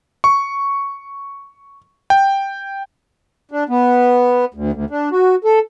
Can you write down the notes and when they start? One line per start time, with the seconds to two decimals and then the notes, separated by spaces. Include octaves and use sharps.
0.24 C#6
2.10 G5
3.51 D4
3.69 B3
4.54 D2
4.73 D2
4.90 D4
5.12 F#4
5.44 A4